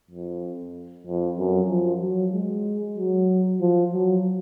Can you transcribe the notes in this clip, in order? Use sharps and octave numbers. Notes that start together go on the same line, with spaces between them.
F2
F2
F#2
F3
F#3
G#3
F#3
F3
F#3